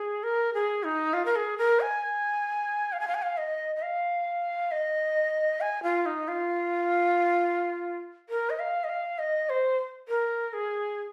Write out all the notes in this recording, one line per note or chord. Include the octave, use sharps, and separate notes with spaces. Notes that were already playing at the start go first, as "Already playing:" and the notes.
Already playing: G#4
A#4
G#4
D#4
F4
A#4
G#4
A#4
G#5
F5
G#5
F5
G#5
F5
D#5
D#5
F5
D#5
G#5
F4
D#4
F4
A#4
D#5
F5
D#5
F5
D#5
C5
A#4
G#4